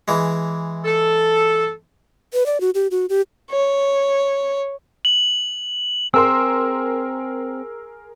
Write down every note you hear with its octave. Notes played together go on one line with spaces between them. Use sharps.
E3 G#3
A4
B4
D5
F#4
G4
F#4
G4
C#5
F#7
C4 G#4 A#4 C6 E6